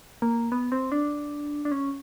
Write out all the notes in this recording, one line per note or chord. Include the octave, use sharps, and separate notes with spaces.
A#3
B3
C4
D4
D4
C#4